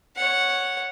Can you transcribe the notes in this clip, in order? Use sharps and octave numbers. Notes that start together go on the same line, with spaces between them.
C#5 F#5